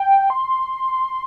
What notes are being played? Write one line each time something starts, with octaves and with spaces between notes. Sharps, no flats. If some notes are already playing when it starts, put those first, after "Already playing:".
Already playing: G5
C6